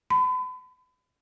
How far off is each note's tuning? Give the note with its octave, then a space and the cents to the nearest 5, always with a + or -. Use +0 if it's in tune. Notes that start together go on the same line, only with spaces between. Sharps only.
B5 +40